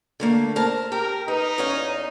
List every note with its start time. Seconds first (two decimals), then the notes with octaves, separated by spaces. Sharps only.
0.20 D3 A3 A#3
0.56 A#4 C5 A5
0.92 G4 A#4
1.28 D#4 B4
1.58 E2 C#4 F5